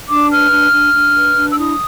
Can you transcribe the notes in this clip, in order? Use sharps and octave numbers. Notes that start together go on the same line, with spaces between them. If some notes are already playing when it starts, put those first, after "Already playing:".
D4 D6
B4 F6
D4
D4
D4
B4
D4
E6
E4 D#6